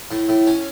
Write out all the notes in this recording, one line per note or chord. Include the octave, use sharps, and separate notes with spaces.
A2
A2
C#4